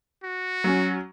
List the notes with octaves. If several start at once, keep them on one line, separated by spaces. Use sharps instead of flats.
F#4
F#3 C#4